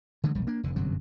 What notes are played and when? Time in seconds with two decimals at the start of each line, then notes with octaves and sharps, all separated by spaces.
0.24 D3 E3 G#3 A3
0.35 E1 A#1 G3
0.47 A#3 D4
0.63 F1 F2 D3
0.76 G1 F#2 C3 F#3